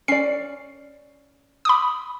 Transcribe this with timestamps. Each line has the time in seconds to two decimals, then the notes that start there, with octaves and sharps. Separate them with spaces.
0.08 C#4 D5 C7
1.65 B5 D6 D#6